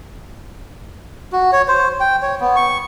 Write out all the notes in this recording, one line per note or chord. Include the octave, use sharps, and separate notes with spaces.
F#4
C#5
C5
G5
C#5
B3
C#6